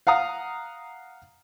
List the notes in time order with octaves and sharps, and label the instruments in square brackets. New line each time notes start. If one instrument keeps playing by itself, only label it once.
[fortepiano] F5 F#5 A#5 D#6